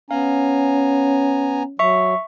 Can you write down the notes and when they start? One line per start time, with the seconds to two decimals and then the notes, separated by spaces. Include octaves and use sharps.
0.11 B3 C#4 F5 G#5 A#5
1.79 F#3 E5 C#6